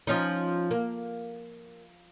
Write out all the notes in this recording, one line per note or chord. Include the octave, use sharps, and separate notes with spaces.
F3 C#4 D#4
A#3